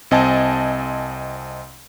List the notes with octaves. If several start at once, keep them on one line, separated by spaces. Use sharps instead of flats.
C2 C4 D#5 G#5 A5